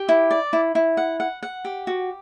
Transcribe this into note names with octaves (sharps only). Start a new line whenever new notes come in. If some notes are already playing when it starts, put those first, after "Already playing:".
Already playing: G4
E4
D5
E4
E4
F#5
F#5
F#5
G4
F#4